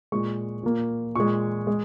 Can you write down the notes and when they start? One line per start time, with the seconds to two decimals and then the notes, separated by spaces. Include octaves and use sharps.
0.12 A#2 G#3 C#6
0.63 A#2 A#3
1.15 A#2 G#3 C#6
1.67 G#3